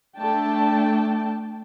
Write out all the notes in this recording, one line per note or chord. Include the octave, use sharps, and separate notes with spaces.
A3 D4 G5 A5